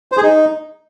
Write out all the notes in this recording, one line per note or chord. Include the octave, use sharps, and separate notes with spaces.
C5
G#4
D#4